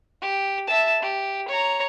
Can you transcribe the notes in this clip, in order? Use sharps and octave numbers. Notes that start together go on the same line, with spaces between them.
G4
E5 A5
G4
C#5 A#5